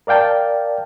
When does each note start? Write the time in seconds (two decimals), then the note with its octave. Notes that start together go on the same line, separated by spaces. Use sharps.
0.07 A#4 D5 F5 G5 A5